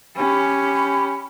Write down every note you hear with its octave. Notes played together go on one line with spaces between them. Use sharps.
C#4 G4 B5